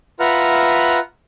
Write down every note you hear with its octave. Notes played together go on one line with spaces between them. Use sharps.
F4 B4 E5 F#5 A#5 F6